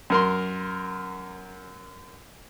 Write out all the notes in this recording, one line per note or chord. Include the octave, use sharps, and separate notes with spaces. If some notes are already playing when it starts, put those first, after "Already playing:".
F#2 A#4 C6